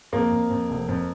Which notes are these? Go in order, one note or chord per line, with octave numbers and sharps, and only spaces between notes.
F2 A#3
F2
F2
F1
F2